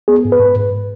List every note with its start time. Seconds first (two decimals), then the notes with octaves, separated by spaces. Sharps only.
0.08 B3 G#4
0.25 G#2
0.32 B4
0.40 G#2
0.56 G#2